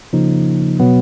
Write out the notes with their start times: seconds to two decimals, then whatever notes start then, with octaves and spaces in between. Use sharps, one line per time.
0.13 C#3 F3 A#3 D#4
0.80 B2 F#3 B3